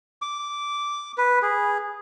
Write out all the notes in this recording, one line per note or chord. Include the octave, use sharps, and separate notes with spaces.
D6
B4
G#4